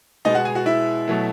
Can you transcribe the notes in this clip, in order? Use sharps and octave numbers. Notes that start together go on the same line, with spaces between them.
B2 G#3 B3 D#4 D#5
F#4 F#5
G#4 G#5
F#4 F#5
E4 E5
B2 F#3 A3